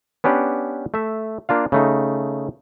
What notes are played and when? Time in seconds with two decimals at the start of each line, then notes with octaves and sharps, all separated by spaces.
0.24 B3 C#4 D4 G4 B4 F#5
0.94 A3 E5
1.49 A#3 D4 F4 F5
1.72 C#3 A3 D#4